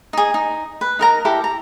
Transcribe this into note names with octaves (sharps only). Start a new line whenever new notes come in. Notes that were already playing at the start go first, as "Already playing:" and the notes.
D#4 G#4
D#4
B4
D#4 A#4 A#5
E4 G4 A4 A#4
A#5